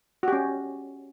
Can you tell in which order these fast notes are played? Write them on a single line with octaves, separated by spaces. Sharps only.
F#4 G4 C#4